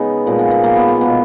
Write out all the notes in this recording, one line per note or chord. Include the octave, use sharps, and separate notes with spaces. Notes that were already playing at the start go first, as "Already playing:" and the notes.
Already playing: C#3 G#3 B3 D#4
A#2 F3 G#3 A#3
B3
B3
A#3
B3
A#3
B2 G#3 B3